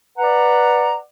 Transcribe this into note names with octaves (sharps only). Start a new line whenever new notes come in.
B4 D5 F#5 A#5